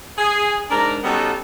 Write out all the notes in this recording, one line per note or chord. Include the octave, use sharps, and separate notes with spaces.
G#4
G#2 D4 A#4 A#5
G3 B3 C#4 D#4 F#4 A4